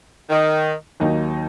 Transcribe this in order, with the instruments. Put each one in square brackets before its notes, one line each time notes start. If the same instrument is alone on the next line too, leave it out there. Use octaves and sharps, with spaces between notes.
[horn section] D#3
[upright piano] D#2 D#3 F#3 A#3 D#4